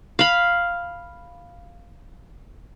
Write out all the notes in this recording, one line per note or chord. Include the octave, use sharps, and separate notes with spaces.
F5 B5